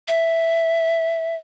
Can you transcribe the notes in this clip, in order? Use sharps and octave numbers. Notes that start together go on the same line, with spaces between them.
E5